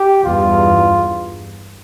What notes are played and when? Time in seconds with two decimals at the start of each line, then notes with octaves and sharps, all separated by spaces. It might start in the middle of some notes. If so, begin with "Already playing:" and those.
Already playing: G4
0.24 E2 G2 F4